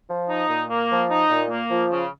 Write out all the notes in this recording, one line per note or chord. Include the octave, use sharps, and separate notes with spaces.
F3
D#4
A#2
A#3
F3
D#4
A#2
A#3
F3
C#3